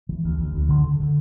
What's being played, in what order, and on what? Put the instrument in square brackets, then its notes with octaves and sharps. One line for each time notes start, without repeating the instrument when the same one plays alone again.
[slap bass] E3
D2
D2
D2
D3
D3
D3